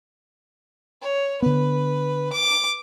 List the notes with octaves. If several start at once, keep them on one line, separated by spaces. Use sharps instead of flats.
C#5
D3 B3 B4
D6